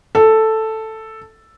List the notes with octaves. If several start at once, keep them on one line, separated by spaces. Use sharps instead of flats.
A4